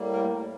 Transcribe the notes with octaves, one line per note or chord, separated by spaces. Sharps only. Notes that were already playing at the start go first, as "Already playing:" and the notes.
Already playing: A2 G3 A#3
A#4